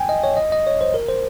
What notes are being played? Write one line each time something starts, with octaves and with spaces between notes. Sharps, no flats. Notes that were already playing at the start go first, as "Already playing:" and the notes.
Already playing: G5 G#5
D#5
C#5
D#5
D#5
C#5
C5
A#4
C5